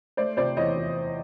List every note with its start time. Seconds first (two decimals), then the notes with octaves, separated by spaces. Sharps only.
0.17 A3 C5 D5
0.37 C3 C5 D5
0.57 E2 C#5 D#5
0.76 E3